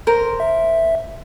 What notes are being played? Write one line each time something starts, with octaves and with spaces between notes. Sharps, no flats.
A#4 C5
E5